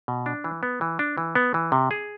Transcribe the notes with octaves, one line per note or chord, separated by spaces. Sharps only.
B2
D4
E3
B3
E3
D4
E3
B3
E3
C3
G#4